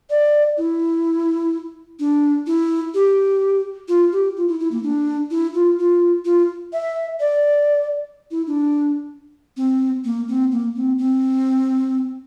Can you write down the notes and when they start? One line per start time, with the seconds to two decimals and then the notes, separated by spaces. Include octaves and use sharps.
0.10 D5
0.57 E4
1.99 D4
2.47 E4
2.94 G4
3.88 F4
4.12 G4
4.37 F4
4.48 E4
4.60 E4
4.71 A#3
4.83 D4
5.31 E4
5.54 F4
5.79 F4
6.25 F4
6.73 E5
7.20 D5
8.31 E4
8.47 D4
9.57 C4
10.04 A#3
10.28 C4
10.52 A#3
10.75 C4
10.98 C4